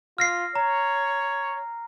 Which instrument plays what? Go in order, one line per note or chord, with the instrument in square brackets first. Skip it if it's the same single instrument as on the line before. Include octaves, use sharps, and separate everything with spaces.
[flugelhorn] F4 [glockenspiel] F6 A#6 C7
[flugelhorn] C#5 [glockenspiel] A#5